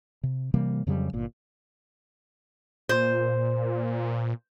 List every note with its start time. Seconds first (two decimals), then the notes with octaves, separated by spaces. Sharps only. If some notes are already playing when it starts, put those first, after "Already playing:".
0.23 C3
0.54 C3 E3 G3 A#3
0.87 F2 C#3 F#3 G3
1.13 G1 A#2
2.89 A#2 C5